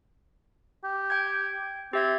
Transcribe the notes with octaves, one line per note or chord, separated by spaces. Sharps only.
G4
G5 G6 G#6
C4 G4 E5 G#6